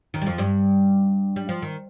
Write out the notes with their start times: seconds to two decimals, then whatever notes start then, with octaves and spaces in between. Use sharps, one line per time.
0.14 D#2 D#3
0.22 G3
0.26 F2 F3
0.38 G2 G3
1.36 G3
1.49 F3
1.62 D#3